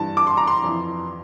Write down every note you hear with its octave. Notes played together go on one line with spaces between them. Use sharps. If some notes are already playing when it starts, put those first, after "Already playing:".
Already playing: G2 E3 A5
D6
C6
A#5
C6
F2 E3